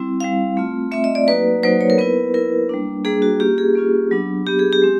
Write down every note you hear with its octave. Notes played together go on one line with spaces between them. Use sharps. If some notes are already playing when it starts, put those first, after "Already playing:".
Already playing: G3 C4 E4
G3 C4 E4 F5
A3 C4 F4
A3 C4 F4 E5
D#5
D5
F#3 A#3 D#4 F#4 B4
F#3 A#3 D#4 F#4 C5
C#5
A#4
B3 E4 B4
B3 E4 A#4
G3 A#3 D4
G3 A#3 D4 G#4
F#4
A#3 C#4 F4 G4
G#4
A#3 C#4 F4
F#3 B3 D4
F#3 B3 D4 G4
G#4
G4
G#3 C4